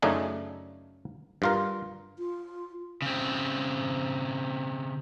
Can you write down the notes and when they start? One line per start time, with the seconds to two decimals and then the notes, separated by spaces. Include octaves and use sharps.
0.02 F#2 C#3 A3 D4 D#4 G#5
1.42 G2 F4 A#4
2.18 F4
3.02 C#3 C4